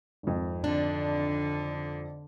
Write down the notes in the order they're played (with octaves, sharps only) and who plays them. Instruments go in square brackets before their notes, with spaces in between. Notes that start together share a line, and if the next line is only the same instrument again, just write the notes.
[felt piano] G#1 F2
[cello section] D3 [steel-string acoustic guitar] D4